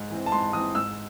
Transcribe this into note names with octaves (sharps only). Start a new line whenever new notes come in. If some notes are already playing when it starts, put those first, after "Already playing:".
Already playing: G#2
E3 C4
A5
G#2 C6
E3 C4 D#6
G#2 E6